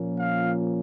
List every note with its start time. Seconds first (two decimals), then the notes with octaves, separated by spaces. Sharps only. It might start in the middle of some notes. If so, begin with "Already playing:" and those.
Already playing: A#2 F3 A#3 C#4
0.17 F5